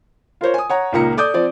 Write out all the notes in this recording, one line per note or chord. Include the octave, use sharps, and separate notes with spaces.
F4 A#4 C5 C#5
G#5 D#6
C#5 F#5 A#5
C#2 A#2 A#3 D#4 A#5 C#7
A4 D5 D6 D#6 G6
F3 C4 D5